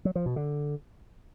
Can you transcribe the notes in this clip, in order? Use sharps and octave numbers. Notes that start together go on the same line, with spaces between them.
F#3
F3
B2
D3